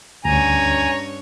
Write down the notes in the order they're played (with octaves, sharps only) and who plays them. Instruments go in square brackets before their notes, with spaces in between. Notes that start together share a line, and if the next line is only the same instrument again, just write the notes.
[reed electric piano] D2 [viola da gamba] G2 C#4 C#5 [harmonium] G#5 [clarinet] A#5